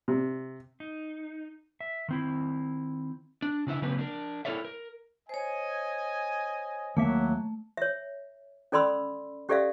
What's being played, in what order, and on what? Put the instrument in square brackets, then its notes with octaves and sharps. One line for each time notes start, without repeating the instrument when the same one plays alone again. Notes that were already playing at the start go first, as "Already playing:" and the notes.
[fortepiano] C3
[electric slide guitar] D#4
E5
D#3 C4 E4
D4
C#3 D4 E4 E5
C#3 F#3 A#3 C4 B4
D4 A#4
E4 A4 A#4 C#5 D5 E5
A#4
[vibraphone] C5 C#5 [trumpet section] D#5 G#5
[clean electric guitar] D#2 A#3 E5 [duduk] F#3 [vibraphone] A3
[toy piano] C#5 E5
C#4 A4 D5 B5 C6 E6
C#4 G4 A4 D5 E5 F5